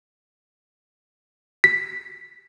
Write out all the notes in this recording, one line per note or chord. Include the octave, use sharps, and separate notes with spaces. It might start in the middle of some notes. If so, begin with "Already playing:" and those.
B6